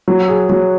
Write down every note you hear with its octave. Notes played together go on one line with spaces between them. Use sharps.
F#3
G#4
F#3